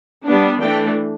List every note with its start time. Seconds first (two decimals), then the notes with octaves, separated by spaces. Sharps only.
0.25 G3 B3 D4
0.61 E3 A3 D4 G5